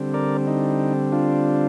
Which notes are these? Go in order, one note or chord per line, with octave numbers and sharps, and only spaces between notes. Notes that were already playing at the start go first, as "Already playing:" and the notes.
Already playing: D3 G3 C4
A#4 D5
D#4
D4 F4